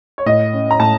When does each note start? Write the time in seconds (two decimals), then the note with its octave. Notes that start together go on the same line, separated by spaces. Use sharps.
0.18 C#5
0.26 A2 D#5
0.53 C#4
0.71 A#5
0.80 A2 A5